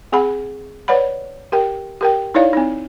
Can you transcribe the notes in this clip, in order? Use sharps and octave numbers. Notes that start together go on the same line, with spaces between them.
C4 G#4 F#5 B5
B4 C#5 D5 F#5 B5
G4 A#4 G5
G4 A#4 G5
D#4 E4 C#5 D5 F5
C4 D#4